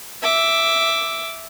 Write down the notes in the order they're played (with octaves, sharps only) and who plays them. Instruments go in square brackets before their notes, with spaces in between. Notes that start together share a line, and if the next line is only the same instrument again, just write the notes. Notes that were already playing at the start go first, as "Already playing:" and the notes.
[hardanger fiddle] E5 D6